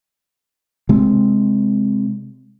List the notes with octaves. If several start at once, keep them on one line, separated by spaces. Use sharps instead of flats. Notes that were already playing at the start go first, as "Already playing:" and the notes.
C3 G#3 C4